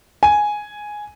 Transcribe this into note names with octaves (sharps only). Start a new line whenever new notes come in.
G#5